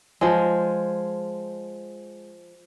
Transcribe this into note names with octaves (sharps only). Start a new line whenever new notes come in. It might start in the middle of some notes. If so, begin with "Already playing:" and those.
F3 G#3